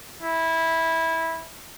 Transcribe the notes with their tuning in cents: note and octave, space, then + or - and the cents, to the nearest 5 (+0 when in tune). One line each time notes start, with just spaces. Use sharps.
E4 -15